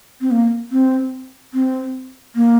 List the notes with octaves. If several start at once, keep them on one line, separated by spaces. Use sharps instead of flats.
C4
A#3
C4
C4
A#3